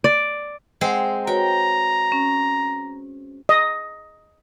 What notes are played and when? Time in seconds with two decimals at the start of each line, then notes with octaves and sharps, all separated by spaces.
0.04 D5
0.81 G#3 C4 C5 F#5 G5
1.27 F#4 B4 C#5 G5 A#5
2.12 C#4
3.49 D#5